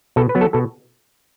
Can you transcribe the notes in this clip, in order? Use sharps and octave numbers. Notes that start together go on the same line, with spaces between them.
B2 A4
B4
F#3 B3
A4
B2 A4